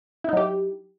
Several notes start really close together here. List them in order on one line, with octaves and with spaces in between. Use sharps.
E4 D#4 F#3 G4